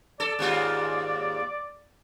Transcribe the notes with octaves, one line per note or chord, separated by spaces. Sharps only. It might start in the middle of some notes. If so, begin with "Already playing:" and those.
A4 D5
D#2 G#2 F4